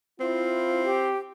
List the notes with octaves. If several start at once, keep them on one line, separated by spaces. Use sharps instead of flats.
C4 E4 F4
G4